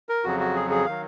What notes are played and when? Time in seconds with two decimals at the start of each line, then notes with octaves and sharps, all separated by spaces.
0.09 A#4
0.24 F2 C#3 F#3 F#4
0.40 F#4
0.55 G#4
0.70 G#4
0.85 D#3 F#3 F5